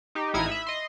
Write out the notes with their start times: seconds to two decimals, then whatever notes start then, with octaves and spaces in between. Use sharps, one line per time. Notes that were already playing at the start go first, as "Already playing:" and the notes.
0.15 D#4 G4
0.34 A1 D#4 E4 D#6 F6 G#6
0.48 E5 B5
0.67 D#5 C6